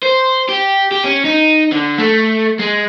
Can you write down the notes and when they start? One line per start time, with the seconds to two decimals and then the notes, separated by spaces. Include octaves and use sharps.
0.02 C5
0.49 G4
0.92 G4
1.05 C#4
1.25 D#4
1.72 D3
1.98 A3
2.60 G#3